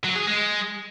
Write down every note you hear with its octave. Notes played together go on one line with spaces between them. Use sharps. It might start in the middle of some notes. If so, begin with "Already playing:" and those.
F#3
G#4
G#3